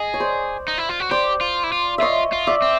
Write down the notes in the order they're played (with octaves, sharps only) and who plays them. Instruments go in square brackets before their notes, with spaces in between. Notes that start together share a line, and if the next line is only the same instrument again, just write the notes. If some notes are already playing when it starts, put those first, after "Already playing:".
Already playing: [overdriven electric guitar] G#4 [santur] D#5
[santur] C#5
C5 D5
[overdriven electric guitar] D#4
E4
F4
F#4
[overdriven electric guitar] G4 [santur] C5 D5
[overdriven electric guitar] F4
E4
F4
[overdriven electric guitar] F4 [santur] C#5 D#5 E5
[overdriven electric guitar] F4
[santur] D5 E5
[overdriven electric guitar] C4